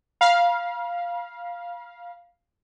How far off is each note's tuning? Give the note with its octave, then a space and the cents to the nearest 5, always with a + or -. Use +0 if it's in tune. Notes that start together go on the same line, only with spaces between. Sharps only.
F5 +0 B5 -45